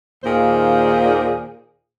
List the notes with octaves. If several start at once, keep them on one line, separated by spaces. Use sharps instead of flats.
D#2 A#2 D#3 A#3 G#4 C5